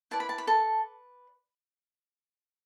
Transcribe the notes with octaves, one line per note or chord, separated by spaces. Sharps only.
E4 B4 D5 A5
B5
A5
B5
A4 A5